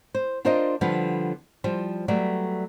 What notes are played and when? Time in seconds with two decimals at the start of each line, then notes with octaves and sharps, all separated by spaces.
0.15 C5
0.45 D4 F4 A#4 C5 D5 D#5
0.81 D3 F3 G3 B3
1.64 F3 G3 C5
2.08 F#3 G3 A3 B3 D5